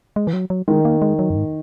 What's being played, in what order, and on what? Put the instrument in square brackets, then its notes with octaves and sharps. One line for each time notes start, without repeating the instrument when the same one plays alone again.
[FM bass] G#3
E3
F#3
F#3
[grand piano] D#3 [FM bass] G#3
[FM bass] A#3
G#3
F#3
F#2
G#2